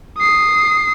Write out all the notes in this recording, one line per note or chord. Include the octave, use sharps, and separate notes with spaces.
D#6 C7